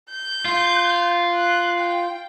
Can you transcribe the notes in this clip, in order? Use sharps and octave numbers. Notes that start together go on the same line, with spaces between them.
G6
F4
F#6
G5